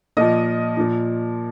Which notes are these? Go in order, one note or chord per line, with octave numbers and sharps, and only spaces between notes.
A#2 F3 D#5
A#2 F3